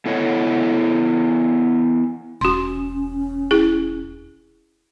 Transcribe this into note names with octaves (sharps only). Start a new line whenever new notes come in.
B3 E4 A4 C#5 D#5 F#5
E1 C#4 F#4 C6
E4 G#4